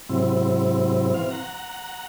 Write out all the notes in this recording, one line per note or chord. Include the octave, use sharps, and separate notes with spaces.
G#2 C3 F#3 C4 E4
E3 C4 F5
F#5 A#5